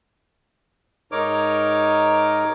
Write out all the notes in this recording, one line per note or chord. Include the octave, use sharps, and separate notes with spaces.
G#2 D#4 A#4 C#5 D6